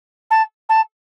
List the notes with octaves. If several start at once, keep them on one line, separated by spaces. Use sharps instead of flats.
A5
A5